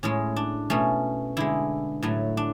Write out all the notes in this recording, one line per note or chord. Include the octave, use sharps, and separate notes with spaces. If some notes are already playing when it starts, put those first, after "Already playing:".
A2 G#3 C#4
D4
B2 A3 C#4
D3 G#3 E4
A2 F#3 A3
D4